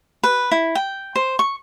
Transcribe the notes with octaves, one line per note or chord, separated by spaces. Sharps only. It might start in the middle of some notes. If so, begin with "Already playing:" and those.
B4
E4
G5
C5
C#6